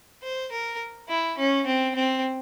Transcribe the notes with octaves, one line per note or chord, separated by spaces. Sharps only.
C5
A#4
E4
C#4
C4
C4